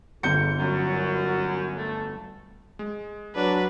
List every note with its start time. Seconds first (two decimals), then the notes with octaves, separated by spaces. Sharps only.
0.23 G1 F2 G#2 G6 C#7
0.58 F#2
1.77 A3
2.79 G#3
3.36 F#3 D4 B4